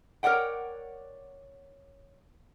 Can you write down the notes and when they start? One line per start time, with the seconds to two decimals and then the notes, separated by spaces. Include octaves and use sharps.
0.23 A#4 C#5 D5 F#5 G5